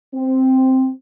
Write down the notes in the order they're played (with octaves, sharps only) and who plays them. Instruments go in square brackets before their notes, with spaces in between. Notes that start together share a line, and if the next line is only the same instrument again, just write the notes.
[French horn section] C4